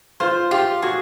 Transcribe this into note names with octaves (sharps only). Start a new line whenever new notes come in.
F4 C5
F4 G4
F#4 G#4